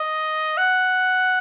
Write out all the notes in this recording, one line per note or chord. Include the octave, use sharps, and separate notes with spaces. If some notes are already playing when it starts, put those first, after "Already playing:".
Already playing: D#5
F#5